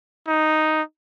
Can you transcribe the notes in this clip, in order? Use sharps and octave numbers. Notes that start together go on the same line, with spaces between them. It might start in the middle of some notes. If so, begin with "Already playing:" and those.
D#4